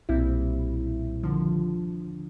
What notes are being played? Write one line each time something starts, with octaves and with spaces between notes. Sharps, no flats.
B1 A#2 G3 C4 E4
D#2 D3 F3